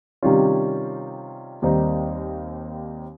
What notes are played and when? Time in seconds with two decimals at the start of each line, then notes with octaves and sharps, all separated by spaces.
0.23 C3 D#3 G3 C#4 F4
1.62 D#2 D#3 G3 C4 D#4